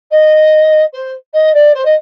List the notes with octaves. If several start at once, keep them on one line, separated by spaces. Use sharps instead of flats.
D#5
C5
D#5
D5
C5
D#5